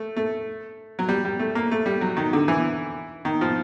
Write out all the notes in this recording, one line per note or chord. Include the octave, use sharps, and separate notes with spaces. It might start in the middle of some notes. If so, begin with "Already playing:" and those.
Already playing: A3
A3
F#3
G3
G3
A3
A#3
A3
G3
F#3
D#3
D3
E3
D#3
F3